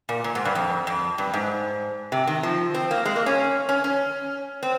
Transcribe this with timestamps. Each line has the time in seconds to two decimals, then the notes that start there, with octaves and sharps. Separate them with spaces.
0.09 A#2
0.24 A#2
0.35 G#2
0.45 G2
0.55 F2
0.87 F2
1.18 G2
1.34 G#2
2.12 C3
2.27 D#3
2.43 F3
2.74 C4
2.91 A#3
3.05 G#3
3.16 A#3
3.26 C#4
3.69 C#4
3.84 C#4
4.63 C4